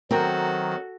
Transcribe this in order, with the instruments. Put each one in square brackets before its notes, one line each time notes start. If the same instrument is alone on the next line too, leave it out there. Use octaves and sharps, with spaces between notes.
[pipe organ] D#3 F#3 [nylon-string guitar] C4 A#4 [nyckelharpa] F#4 A4